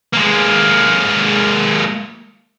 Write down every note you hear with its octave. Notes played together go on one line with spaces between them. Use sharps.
G#3 A#3